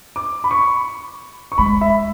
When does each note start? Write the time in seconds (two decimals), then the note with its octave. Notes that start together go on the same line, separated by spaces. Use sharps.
0.16 D6
0.44 B5
0.51 C#6
1.52 C#6
1.58 G#3 B5
1.81 E5